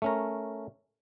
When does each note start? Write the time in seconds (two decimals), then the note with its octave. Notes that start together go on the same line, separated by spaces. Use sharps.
0.02 A3 C#4 A#4